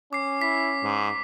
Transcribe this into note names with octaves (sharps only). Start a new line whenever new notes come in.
C#4 D6 C7
E4 B6
G#2